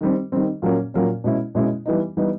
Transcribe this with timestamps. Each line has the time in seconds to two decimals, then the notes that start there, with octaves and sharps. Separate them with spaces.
0.01 D#3 G3 C4
0.32 D#3 G3 C4
0.62 A#2 F#3 A#3 C#4
0.94 A#2 F#3 A#3 C#4
1.24 B2 G#3 C#4 E4
1.55 B2 G#3 C#4 E4
1.86 E3 G3 B3 D#4
2.17 E3 G3 B3 D#4